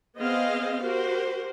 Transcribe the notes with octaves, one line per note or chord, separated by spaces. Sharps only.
B3 C4 G#4 C5 D#5 F5
F#4 G4 A#4 C5